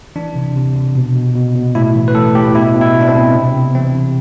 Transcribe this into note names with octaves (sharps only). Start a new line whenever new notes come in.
E3 D4
C3
C3
C3
B2
B2
B2
B2
A2 E4
E3
B4
A2 A4
A2 G4
B2 E4
B2
E4
B2
D4
C4
B2
C3
C3
E3 C4
C3